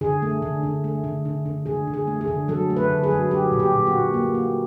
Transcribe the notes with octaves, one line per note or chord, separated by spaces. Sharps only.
D3 G#4
A3
D3
D3
A3
D3
D3
D3
D3 G#4
D3
G#4
A3
G#4
D3
F#3 A4
A3
B4
D3
G#4
F#3
F#3 G4
A#2
G4
A#2
F#4
A#2
A#3
A#3